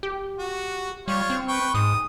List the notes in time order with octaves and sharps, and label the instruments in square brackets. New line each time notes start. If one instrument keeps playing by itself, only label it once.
[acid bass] G4
[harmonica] F#4
[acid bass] G3 [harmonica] F4 C#5
[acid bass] C4
[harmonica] B4 G5 C#6
[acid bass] G#2 [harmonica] D#6